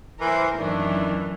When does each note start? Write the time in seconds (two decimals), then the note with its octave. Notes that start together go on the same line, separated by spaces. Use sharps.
0.20 E3 A#4 C5
0.58 F#2 D#3 E3 A3 D4